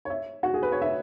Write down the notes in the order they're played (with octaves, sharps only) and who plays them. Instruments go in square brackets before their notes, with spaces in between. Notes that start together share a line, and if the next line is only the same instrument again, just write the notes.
[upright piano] C#5
E5
F#4
G#4
B4
C#5
E5